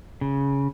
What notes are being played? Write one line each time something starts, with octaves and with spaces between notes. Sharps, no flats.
C#3